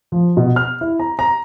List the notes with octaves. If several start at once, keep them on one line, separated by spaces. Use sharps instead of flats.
F3
B2
F6
E4
A#5
A#5